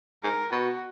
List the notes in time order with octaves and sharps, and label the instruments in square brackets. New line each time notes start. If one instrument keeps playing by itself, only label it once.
[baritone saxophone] G#2 [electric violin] A#4
[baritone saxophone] B2 [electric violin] F#4